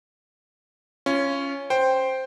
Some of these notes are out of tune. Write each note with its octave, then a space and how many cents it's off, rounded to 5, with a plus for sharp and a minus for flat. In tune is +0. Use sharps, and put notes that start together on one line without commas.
C#4 +0 F4 -30
C5 +0 G5 +0